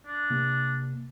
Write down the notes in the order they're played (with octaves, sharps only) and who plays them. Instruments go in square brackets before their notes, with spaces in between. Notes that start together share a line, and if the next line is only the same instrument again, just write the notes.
[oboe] D4
[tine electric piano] C3 A#3